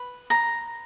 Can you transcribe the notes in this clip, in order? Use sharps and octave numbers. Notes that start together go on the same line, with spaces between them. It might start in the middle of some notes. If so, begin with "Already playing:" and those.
Already playing: B4 B5
A#5